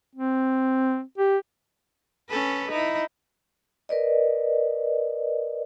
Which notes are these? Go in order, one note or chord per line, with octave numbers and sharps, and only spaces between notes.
C4
G4
C#4 A4 B4
D#4 E4
A#4 B4 D5 D#5